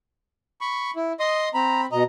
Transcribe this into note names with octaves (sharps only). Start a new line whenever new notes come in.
B5 C#6
E4
D#5 C6 D#6
C4 A#5 B5
B2 D#5 A#5